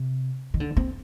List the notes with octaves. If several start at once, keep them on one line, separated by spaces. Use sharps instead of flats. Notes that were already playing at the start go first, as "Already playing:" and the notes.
Already playing: C3
D#3
D3
C4